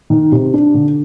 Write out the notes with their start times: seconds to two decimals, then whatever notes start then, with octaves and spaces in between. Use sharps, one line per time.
0.10 D#3
0.32 C3
0.54 D4
0.74 D3